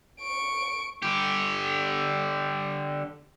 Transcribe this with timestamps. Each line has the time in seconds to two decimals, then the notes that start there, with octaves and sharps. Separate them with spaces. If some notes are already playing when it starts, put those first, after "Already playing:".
0.20 C#6 D7
1.02 D3 G4